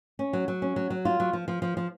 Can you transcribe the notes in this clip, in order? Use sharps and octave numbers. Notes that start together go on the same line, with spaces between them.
C#4
F#3
F#3
C#4
F#3
F#3
F4
F#3
F3
F3
F3
F3